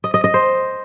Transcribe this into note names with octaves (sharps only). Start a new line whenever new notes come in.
D#5
D#5
D#5
C5